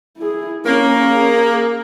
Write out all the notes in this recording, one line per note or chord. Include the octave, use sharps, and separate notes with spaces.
E4 G#4
A#3 C#4
G#4